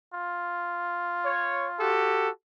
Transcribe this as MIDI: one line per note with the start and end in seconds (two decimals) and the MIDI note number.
0.14 1.93 65
1.25 1.67 73
1.80 2.29 66
1.80 2.29 67
1.80 2.29 69